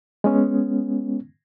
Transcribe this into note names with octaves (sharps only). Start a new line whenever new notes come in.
G#3 B3 C#4